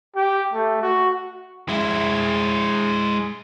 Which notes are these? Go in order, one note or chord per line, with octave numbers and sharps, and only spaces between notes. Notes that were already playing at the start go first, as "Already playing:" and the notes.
G4
A3
F#4
G#3 E4